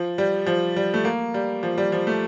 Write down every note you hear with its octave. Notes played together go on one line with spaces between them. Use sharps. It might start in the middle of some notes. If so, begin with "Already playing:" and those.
Already playing: F3
G3
F3
G3
A3
A#3
G3
F3
G3
F3
A3